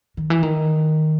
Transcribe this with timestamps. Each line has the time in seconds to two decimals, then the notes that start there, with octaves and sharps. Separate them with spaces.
0.17 D#3
0.30 E3
0.43 D#3